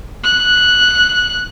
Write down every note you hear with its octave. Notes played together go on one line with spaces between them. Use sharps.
F#6